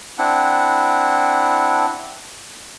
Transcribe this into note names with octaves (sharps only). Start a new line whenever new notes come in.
C4 D4 E4 F#5